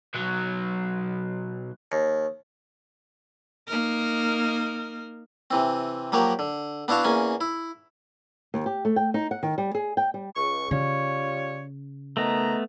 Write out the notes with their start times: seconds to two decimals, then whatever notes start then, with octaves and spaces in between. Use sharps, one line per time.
0.14 B1 F#3
1.92 D#2
3.68 A#3 D#4 A#4
5.51 C3 E3 C4
6.12 F3 F#3 A#3 G4 A#4
6.39 D3
6.88 B3 D4 E4 F#4 F5 A5
7.04 E2 A#3 C#4 G#5
7.41 E4
8.54 D#2
8.66 G4
8.85 A3
8.96 G5
9.14 D#4
9.31 F#5
9.43 D#3
9.58 G3
9.75 G#4
9.97 G5
10.14 G3
10.36 C#2 C#6
10.71 C#3 G3 F4 C#5
12.17 D#3 A3 B3 D#5 A#5